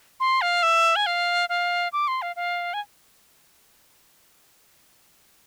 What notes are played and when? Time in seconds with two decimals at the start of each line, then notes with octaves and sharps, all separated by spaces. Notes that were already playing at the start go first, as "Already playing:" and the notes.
0.20 C6
0.42 F5
0.63 E5
0.96 G#5
1.06 F5
1.49 F5
1.93 D6
2.08 C6
2.22 F5
2.36 F5
2.74 G#5